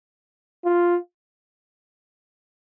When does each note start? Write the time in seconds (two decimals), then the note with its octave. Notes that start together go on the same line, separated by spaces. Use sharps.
0.65 F4